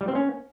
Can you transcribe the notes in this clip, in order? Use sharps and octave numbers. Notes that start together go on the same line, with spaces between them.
G3
C4
C#4